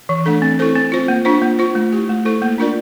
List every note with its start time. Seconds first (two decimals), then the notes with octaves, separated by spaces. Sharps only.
0.09 E3
0.26 A3 D4 A4
0.42 C4
0.59 E4 A4 C5
0.75 C4
0.92 F4 C5
1.08 A#3
1.25 D4 F4 C5
1.42 A#3
1.59 F4 C5
1.75 A3
1.92 E4 G4
2.09 A3
2.25 E4 A4 C5
2.42 A#3
2.58 D4 F4 A#4 D5